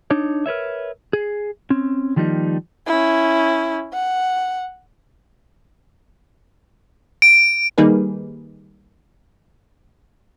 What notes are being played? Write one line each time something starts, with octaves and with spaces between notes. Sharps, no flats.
D4 D#4 C#5
A#4 B4 C#5 E5
G#4
C4 C#4
D#3 F3 G3 A#3 D#4
C#4 E4
F#5
D7
D#3 G3 A#3 D#4 G#4 B4